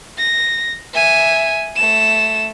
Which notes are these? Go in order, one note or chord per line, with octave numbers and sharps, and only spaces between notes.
A#6
E5 G#5
A3 E7